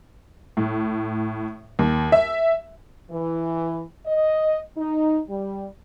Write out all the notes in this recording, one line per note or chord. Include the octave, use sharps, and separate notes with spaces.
A2
D#2
E5
E3
D#5
D#4
G3